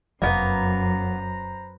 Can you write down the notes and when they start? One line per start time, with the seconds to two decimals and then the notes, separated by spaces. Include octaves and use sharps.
0.22 F1 F#2 A#3 B3 B4 C5 A#5